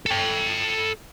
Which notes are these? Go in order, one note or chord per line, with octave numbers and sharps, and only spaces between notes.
A4 G5